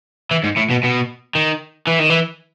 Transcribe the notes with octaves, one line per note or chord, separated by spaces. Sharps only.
E3
G#2
A2
B2
B2
D#3
E3
D#3
E3